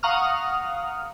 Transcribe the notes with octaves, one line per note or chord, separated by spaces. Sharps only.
F5 F#5 A#5 C#6 D#6 F6